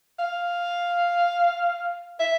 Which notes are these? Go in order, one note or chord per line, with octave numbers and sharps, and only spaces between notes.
F5
E5